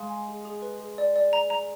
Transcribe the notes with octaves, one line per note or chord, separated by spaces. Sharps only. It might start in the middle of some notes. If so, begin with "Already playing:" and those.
Already playing: G#3 F5
G#5
G#4
G#4
B4
G#4
D5
D5
A#5
A#5